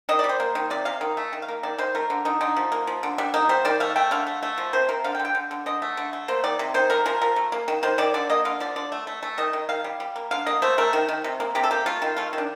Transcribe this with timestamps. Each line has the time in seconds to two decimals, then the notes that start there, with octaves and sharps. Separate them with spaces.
0.09 D#3 D#5
0.19 G3 D5
0.29 C5
0.40 A#3
0.55 D#3
0.70 C3 D5
0.85 C3 F5
1.01 D#3
1.17 A3
1.33 D#3
1.42 F5
1.48 A#3
1.63 D#3 D5
1.78 D#3 C5
1.95 A3 A#4
2.10 D3
2.25 D3 D#4
2.41 D3 D#4
2.57 F3
2.72 A#3
2.87 F3
3.03 D3
3.18 G3 D4
3.34 A#3 D#4
3.49 G3 C5
3.65 D#3 D5
3.80 A3 F5
3.96 A3 G5
4.11 D3 F5
4.27 A3
4.43 A3
4.58 F3
4.73 C3 C5
4.89 C3 A#4
5.04 D3 F5
5.15 G5
5.19 D3
5.25 G5
5.35 D3
5.51 D3
5.66 D3 D#5
5.82 A3
5.97 D3
6.13 A3
6.28 A#3 C5
6.44 D#3 D5
6.59 C3
6.74 D#3 C5
6.90 A3 A#4
7.06 F3 A#4
7.22 F3 A#4
7.36 A3
7.52 A#3
7.68 D#3
7.83 D#3 C5
7.98 D#3 D5
8.14 D3 D5
8.30 A#3 D#5
8.45 D3 F5
8.60 F3 D5
8.76 D3 D5
8.92 A3
9.07 A3
9.23 A3
9.38 D#3 D#5
9.53 D#3
9.69 D#3 F5
9.84 G3
10.00 G3
10.16 A#3
10.31 D3 F5
10.47 A#3 D#5
10.62 A3 C5
10.78 A3 A#4
10.93 D#3
11.09 D#3
11.24 C3
11.40 A#3
11.55 C3 G4
11.64 A4
11.71 A#3 G4
11.86 A3 F4
12.02 D#3
12.16 A3 F4
12.33 D#3
12.38 D4